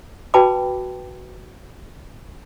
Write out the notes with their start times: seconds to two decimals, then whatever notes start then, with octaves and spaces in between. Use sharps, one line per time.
0.34 F#4 B4 G5 A5 B5 D6